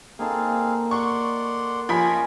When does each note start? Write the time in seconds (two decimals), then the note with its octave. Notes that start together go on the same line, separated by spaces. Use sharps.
0.19 A#3 C4 D#4 G#4 A4 F5
0.91 D5 F#5 C6 C#6
1.89 F3 C#4 F4 C#5 D#5 G#5 B5 B6